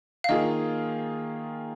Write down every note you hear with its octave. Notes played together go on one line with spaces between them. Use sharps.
F5
D#3 A#3 F4 G#4 D#5